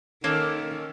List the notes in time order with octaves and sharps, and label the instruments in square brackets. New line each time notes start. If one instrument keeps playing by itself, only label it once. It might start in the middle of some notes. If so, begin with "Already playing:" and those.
[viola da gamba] D#3 [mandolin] A#3 [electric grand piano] C#4 A4 E7